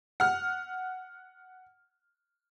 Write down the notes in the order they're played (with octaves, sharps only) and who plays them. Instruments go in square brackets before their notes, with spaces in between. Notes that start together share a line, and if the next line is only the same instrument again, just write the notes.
[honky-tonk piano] F#5 F6